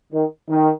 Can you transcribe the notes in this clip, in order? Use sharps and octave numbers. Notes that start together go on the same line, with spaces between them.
D#3
D#3